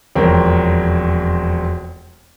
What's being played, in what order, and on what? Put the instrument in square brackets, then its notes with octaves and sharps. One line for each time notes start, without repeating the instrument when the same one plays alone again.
[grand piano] E1 F2 C4 A#4 C#5 G5